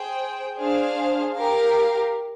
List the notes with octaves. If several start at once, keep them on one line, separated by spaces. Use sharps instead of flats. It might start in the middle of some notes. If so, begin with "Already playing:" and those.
Already playing: G#4 C5 G5
D4 G#4 C5 F5
G4 A#4 F5